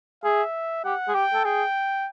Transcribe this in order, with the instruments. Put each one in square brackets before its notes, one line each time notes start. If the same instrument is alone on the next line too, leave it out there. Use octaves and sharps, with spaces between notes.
[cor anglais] G#4 [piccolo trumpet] E5
[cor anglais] G4 [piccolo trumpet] F#5
[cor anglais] G#4
[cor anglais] G4 [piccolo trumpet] G5
[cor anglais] A4
[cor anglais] G#4 [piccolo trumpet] G5